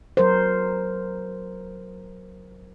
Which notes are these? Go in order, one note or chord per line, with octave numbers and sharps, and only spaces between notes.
F#3 A#4 C5